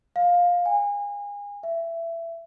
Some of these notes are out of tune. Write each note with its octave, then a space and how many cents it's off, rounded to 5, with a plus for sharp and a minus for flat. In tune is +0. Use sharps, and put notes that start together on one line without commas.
F5 +15
G#5 -30
E5 +20